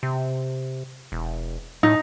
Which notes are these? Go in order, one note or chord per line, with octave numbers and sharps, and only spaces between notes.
C3
E1
A2 D#4